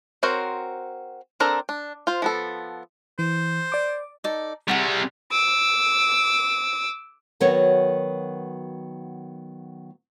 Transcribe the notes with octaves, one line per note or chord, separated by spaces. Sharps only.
C4 F#4 A#4 C5 C#5
C4 D4 A4 A#4 A#5
D4
F4 C5
F3 B3 A4
E3 C5
D5 D6
D#4 A4 D5
C3 G3 G#4 F#5 C#6
D6 E6
D#3 F#3 B3 F#4 A#4 C#5